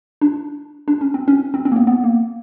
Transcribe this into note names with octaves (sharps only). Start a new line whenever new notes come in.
D4
D4
C#4
C4
C#4
C4
C4
A#3
B3
B3
A#3